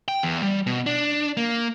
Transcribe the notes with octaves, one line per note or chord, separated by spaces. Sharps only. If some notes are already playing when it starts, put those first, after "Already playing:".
G5
E2
G3
B2
D4
A#3